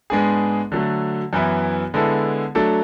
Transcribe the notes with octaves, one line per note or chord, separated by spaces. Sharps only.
G#2 G#3 B3 D4 G#4
D3 F#3 A3
F#2 E3 B3 E4
D3 G#3 B3 E4 A4
F#3 A3 D4 A4